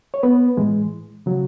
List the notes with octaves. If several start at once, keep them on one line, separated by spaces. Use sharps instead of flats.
C#5
B3 B4
A2 E3 G#3
C#3 F#3